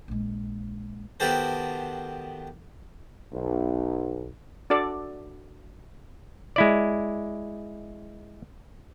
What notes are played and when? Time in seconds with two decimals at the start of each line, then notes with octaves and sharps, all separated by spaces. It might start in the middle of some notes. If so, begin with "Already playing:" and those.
0.08 A#1 G#3
1.20 D#3 B3 F#4 G4 A4 C5
3.32 B1
4.70 D4 F#4 A4 D5
6.56 G#3 E4 D5